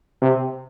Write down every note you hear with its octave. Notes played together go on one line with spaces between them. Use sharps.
C3